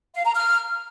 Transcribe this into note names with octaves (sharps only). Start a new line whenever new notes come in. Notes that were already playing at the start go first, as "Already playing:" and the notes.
F5
A#5
F6